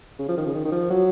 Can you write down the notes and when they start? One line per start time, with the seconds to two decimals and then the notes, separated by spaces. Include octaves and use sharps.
0.19 C#3
0.28 F3
0.37 D#3
0.46 C#3
0.54 D#3
0.65 D#3
0.72 F3
0.90 F#3